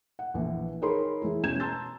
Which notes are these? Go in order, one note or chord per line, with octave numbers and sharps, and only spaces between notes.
F#5
A#1 E3
D#4 G#4 A#4 C#5 B5 C6
E3 G#3 E4
E1 E2 C#4 G6 G#6 E7
A5 A#5 C6 E6 G6 A6